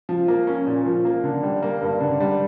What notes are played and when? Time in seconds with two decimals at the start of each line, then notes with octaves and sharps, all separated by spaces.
0.09 F3
0.28 A#3
0.47 C#4
0.67 A#2
0.86 F3
1.05 A#3
1.24 D3
1.43 G3
1.62 A#3
1.82 G2
2.00 D3
2.20 G3